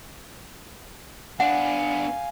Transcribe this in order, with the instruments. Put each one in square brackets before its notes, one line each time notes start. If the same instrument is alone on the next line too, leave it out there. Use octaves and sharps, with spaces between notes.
[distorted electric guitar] B3 D4 [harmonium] F5 G#5 [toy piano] F#5